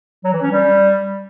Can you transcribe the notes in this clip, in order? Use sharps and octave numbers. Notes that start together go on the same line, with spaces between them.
F#3
E3
C#4
G3